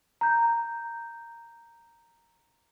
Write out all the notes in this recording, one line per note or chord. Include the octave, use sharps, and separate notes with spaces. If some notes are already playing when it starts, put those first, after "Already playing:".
A#5 G6